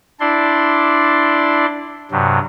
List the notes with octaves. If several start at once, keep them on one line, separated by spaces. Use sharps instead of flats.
D4 E4 D5 C6
G2 C3 F#3